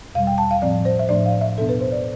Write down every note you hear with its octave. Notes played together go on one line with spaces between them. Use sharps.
E2 B2 G3 F5
G5
A5
F5
A2 F3 C4 D5
C5
E5
A2 F3 A3 D4 D5
F5
E5
E2 B2 B3 D4 A4
B4
C5
D5